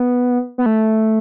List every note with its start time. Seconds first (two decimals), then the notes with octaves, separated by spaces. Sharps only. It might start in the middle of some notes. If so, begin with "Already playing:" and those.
Already playing: B3
0.58 B3
0.66 A3